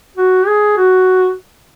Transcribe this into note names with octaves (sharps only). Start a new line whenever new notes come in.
F#4
G#4
F#4